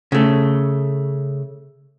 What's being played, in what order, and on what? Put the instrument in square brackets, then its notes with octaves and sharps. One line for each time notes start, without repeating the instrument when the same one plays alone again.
[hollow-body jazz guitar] C#3 A3